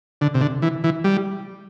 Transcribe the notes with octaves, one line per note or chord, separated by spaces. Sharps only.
D3
C3
D3
E3
E3
G3